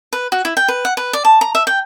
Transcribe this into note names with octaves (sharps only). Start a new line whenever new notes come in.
B4
F#4
E4
G5
B4
F#5
B4
D5
A5
A#5
E5
G5